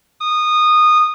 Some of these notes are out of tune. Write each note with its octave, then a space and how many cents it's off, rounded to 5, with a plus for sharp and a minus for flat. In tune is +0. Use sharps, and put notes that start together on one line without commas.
D#6 -20